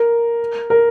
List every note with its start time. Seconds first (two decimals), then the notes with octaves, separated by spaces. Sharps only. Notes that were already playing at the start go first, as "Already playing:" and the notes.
Already playing: A#4
0.70 A#4